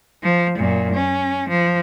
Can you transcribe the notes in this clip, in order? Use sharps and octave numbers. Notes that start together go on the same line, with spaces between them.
F3
F#2 A#2
C#4
F3